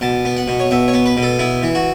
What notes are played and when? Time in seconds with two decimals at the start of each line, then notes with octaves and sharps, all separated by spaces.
0.01 B2 A5
0.25 B3
0.37 F#5
0.48 B2
0.60 C#5
0.71 B2 E5
0.88 C#5
0.93 B3
1.06 B4
1.17 B2
1.23 A4
1.39 B3 E4
1.63 E3
1.75 F#4